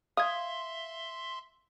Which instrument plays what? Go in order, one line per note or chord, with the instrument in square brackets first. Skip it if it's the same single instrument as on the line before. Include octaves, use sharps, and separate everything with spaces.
[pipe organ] E5 C6 [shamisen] F5 [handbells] D#6 G#6